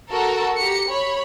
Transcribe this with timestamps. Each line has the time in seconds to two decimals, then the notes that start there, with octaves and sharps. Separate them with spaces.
0.11 F#4 A4 A#4
0.56 G4 A#5 C#7
0.89 C#5 B5